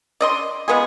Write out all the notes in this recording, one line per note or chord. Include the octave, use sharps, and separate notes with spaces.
D5 D#5 C6
G#3 B3 F4 G#4